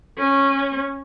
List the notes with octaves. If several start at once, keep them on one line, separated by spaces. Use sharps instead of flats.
C#4